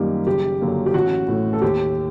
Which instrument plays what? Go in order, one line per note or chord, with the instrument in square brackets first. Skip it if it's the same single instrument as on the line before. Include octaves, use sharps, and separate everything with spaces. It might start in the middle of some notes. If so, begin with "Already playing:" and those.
Already playing: [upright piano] F#2 D#3 G3 A#3 G4
F#1 G4
F#2 D3 F#3 A#3
G4
A1 F#4
A2 A3
A4
D#2 G4